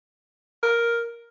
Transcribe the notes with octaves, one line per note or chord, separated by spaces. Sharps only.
A#4